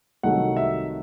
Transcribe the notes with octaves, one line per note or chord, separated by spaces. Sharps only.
C2 C3 D#3 F#3 A3 F#5
E5